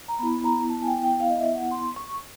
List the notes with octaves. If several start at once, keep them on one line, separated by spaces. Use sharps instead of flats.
A#5
B3 E4 B5
B5
A#5
A5
G#5
G5
G5
F5
D#5
E5
F#5
C6
C#6